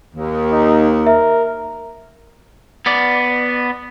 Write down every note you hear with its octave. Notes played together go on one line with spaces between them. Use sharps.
D#2
D#4
A#4 E5
B3 D5